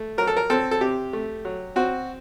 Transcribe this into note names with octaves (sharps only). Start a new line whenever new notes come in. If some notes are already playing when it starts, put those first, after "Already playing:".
Already playing: A3
F#3 A#4
A4
A#4
C4 A4
A4
C3 G4
A3
F#3
C4 F#4